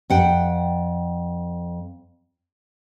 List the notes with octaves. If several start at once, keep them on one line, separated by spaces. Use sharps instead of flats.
F2 F#5 G5